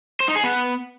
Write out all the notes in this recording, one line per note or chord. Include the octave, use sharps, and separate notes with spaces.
C5
D#4
G#4
B3